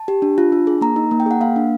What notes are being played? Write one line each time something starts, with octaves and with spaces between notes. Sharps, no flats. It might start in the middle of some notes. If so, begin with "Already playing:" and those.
Already playing: A5
G4
D4
F4
D4
G#4
A#3 A#5
D#4
A#3
G5
G#4 F#5
A#3 F5
D4